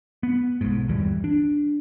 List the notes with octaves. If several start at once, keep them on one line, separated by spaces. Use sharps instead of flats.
B3
B1 G#2
G1 D#2 E3 G3
D4